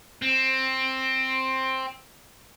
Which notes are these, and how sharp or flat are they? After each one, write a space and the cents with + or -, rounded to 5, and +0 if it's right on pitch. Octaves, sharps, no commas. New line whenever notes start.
C4 +10